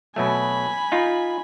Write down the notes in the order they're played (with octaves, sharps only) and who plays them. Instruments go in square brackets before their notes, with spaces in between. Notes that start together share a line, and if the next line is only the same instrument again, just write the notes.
[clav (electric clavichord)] B2 F#3 A3 [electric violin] G#5 B5
[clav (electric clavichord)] D#4 F4